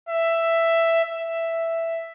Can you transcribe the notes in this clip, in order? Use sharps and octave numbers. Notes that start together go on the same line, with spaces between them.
E5
E5